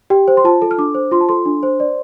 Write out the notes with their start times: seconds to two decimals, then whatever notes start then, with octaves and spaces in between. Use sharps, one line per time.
0.10 G4 G5
0.28 C5
0.37 C6
0.44 F4 A5
0.62 A4
0.71 F6
0.78 D4 D6
0.95 C5
1.11 F4 C6
1.21 A5
1.29 A4 C6
1.46 D4
1.63 C5
1.80 D5